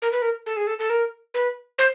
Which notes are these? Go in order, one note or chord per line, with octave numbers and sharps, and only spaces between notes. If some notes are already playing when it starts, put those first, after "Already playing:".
A#4
B4
A#4
A4
G#4
A4
A4
A#4
B4
C5